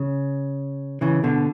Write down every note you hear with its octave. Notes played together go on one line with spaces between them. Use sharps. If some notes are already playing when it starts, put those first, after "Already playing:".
Already playing: C#3
C#3 E3
B2 D3